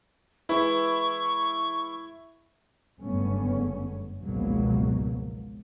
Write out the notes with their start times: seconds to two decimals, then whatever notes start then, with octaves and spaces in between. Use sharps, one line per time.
0.49 E3 G#3 E4 B4 C#6
3.00 F#1 G2 D3 A3 B3 C#4
4.21 G#1 C#2 B2 F3 F#3 A#3